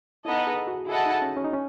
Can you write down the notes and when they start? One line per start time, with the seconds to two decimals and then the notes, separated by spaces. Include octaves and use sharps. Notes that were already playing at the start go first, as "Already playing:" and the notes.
0.25 B3 D#4 E4 A4 D#5
0.47 G#4
0.67 F#4
0.89 E4 G#4 A4 D#5 F#5 A5
1.06 D#4
1.22 C#4
1.37 C#4
1.45 D#4
1.53 C#4